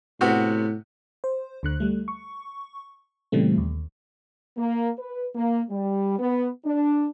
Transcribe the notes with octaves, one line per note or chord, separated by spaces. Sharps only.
A2 C3 B3 F#4
C5
D2 D3 F#6
G3 A3
C#6
A#2 C#3 E3 G3 A3 C4
D#2
A#3
B4
A#3
G3
B3
D4